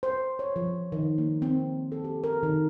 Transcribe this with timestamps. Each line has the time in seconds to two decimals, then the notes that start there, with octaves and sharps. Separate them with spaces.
0.03 C5
0.39 C#5
0.56 F3
0.92 D#3
1.18 A#3
1.42 C4
1.92 A4
2.04 G4
2.24 A#4
2.43 D#3